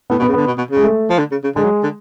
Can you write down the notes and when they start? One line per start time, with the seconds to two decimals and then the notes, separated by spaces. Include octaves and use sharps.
0.10 A2 B3
0.19 B2
0.22 B3
0.28 C#3
0.34 D3 B3
0.47 B2
0.58 B2
0.71 C#3
0.76 G#3
0.83 A3
1.10 F3
1.19 D3
1.32 C#3
1.44 C#3
1.56 D3 G#3
1.64 F#3
1.83 D3